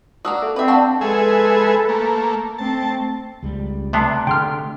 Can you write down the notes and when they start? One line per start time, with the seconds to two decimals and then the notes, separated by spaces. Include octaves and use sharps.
0.25 A#3 D4 F#4 D#6 E6
0.42 A4 E5
0.56 C4 B4 D5 E5
0.68 D4 F5 F#5 A5 B5 C#6
1.01 G#3 G#4 A4 B4 E5
1.89 A3 A#3
2.58 A3 C4 A5
3.43 C#2 G3
3.93 C3 A3 B3 D4 A5 C7
4.27 D3 A3 G5 C6 F6